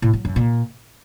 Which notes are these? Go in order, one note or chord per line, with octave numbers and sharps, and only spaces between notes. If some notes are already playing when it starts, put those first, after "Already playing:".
A2
F#3
F#2
A#2